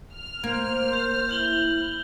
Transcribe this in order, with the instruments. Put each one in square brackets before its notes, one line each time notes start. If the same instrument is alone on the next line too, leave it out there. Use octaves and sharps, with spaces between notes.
[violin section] F6
[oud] A#3 [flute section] C5
[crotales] G6
[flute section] E4 [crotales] G6 F#7 G7